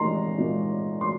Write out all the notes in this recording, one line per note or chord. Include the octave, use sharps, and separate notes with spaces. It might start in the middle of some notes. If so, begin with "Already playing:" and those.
Already playing: A#2 G#3 D#4 A#5 C6
A#2 G#3 D#4
C6